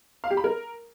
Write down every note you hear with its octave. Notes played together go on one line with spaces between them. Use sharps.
F5
G4
B5
A#4